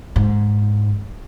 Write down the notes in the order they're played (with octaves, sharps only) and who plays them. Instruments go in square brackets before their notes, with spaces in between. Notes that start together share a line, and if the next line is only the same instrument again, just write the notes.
[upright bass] G#2